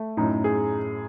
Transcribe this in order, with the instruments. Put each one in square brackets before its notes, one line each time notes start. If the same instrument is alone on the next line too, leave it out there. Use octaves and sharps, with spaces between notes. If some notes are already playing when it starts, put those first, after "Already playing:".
Already playing: [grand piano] A3
[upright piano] F#2 A2 [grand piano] D#4
[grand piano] G#4